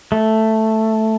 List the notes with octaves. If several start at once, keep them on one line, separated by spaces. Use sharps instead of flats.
A3